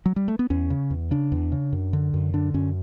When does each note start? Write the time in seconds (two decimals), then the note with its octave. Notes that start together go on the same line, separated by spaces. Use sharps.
0.06 F#3
0.16 G3
0.28 A3
0.39 B3
0.50 E2 C#4
0.70 C#3
0.91 E2
1.11 C#3 D4
1.32 E2
1.52 C#3
1.73 F#2
1.93 D3
2.14 F#2
2.34 D3 D4
2.54 F#2 C#4